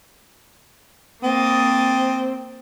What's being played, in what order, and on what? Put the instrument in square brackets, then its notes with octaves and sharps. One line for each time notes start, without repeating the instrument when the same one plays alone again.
[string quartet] A#3 D#6 A6 [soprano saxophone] C4